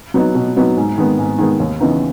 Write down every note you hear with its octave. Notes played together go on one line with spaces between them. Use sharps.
F#3 B3 D#4
B2
F#3 B3 D#4
G#2
D#3 G#3 B3
G#2
D#3 G#3 B3
D#2
C#3 E3 B3 D#4